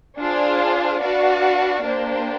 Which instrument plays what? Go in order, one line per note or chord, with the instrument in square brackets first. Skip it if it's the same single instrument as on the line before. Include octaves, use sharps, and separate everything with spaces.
[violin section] D4 F4 G#4 C5 F5
D4 F#4 B4 D5 F5
A#3 D4 G4 C5